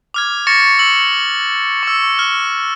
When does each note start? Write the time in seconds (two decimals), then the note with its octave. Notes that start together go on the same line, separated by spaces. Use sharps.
0.14 D6 F6 G#6
0.47 C#6 A6 A#6 C#7
0.79 E6 F#7
1.83 C#6 E6
2.19 F6